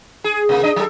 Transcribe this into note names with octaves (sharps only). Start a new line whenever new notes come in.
G#4
C3 A#3
D4 D#5
F#3 A4